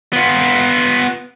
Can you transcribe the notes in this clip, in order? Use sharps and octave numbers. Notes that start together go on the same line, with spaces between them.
B3 F4